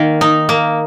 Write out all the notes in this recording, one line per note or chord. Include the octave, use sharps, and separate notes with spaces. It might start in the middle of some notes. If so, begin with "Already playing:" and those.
Already playing: D#3 A#3
D#4
A#3